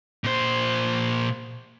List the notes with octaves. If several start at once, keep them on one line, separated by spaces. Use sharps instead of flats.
A#2 C5